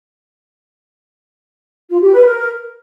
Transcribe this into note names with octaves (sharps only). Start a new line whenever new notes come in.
F4
G4
B4
A#4